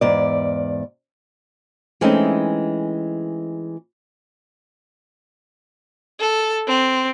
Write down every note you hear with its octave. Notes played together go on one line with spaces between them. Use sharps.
E2 G#2 D5
E3 G#3 A3 C4 C#4 D#4
A4
C4